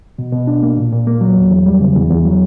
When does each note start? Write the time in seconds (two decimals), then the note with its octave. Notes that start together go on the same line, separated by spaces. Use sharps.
0.19 B2
0.32 B2
0.47 D4
0.63 A#3
0.77 A#2
0.92 A#2
1.07 A#3
1.21 F#3
1.36 E2
1.51 E2
1.66 G3
1.81 C#3
1.96 E2
2.11 E2
2.25 F#3